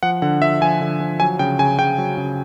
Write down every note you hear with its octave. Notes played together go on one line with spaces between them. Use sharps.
F3 F#5
D3 F#5
F3 E5
F3 G#5
D3
F3
F#3 G#5
C#3 G5
C#3 G#5
C#3 G5
F#3
C#3